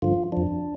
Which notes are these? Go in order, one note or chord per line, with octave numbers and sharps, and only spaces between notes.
G2 D3 F3 F4
F2 F3 D4